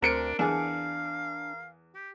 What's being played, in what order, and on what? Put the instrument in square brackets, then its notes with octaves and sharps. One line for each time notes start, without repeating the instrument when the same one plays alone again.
[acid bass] D2 [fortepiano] C4 [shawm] D4 [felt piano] A#4 C#7 D7
[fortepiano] E2 G#4 [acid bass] D4 [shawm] F5
[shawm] G4